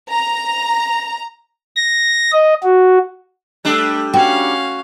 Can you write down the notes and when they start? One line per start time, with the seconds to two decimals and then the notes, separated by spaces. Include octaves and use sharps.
0.11 A#5
1.76 A#6
2.32 D#5
2.63 F#4
3.65 G3 A3 D4 E5
4.14 C#4 F#4 F5 G5